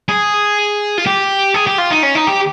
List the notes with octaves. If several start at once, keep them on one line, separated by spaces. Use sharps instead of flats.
G#4
F4
G4
G#4
G4
F4
D#4
C#4
D#4
G4